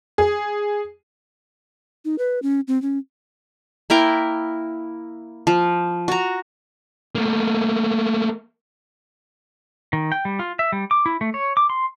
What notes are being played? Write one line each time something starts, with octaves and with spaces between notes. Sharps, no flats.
G#4
D#4
B4
C#4
C4
C#4
A#3 E4 A#4 G5
F3
F#4 A#5
A3 A#3
D#3
G5
G3
F4
E5
G3
D6
E4
A3
C#5
D6
C6